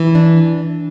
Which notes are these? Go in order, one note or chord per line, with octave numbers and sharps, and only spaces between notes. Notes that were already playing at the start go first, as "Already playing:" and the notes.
Already playing: E3
D4